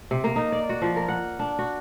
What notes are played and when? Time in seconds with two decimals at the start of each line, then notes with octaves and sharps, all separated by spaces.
0.11 C3
0.24 A#3
0.36 D#4
0.52 D5
0.69 F#4
0.82 F3
0.96 A#4
1.08 F#5
1.39 D4
1.59 F#4